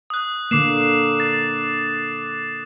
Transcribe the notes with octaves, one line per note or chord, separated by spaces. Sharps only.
D#6 F#6
D3 A#3 D6 C7 E7
A6